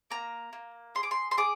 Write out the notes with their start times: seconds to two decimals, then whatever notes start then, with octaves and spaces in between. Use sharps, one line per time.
0.10 A#3 A#5
0.53 A#3
0.95 G#4 C6
1.03 D6
1.11 C6
1.31 C6
1.37 G#4 D6